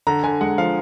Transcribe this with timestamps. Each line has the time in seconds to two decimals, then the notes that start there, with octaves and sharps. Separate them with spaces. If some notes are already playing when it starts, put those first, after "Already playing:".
0.07 D3 A#5
0.23 D3 G#5
0.41 G#3 F#5
0.58 F3 F5